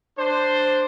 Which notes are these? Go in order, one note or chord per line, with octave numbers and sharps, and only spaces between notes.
D4 C5